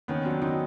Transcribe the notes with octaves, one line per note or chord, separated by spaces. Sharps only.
D#3 B3 C#4
F#3 C4 D4
D#3 C#4 D#4